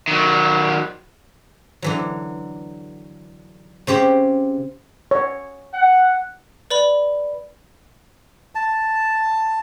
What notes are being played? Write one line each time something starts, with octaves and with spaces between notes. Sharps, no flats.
D#3 F#3
D3 E3 F#3
C#3 C4 G4 C#5
C#5
F#5
B4 D5 B5
A5